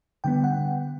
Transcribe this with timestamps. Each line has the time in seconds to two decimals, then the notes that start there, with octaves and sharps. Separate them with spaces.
0.24 D3 G3 B3 G5
0.44 F#5